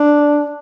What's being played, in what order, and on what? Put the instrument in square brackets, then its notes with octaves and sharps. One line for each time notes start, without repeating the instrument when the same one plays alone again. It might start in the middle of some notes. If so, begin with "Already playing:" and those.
Already playing: [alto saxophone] D4